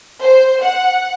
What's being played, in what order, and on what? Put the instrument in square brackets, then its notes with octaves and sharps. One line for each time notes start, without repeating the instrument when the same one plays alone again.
[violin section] C5
F#5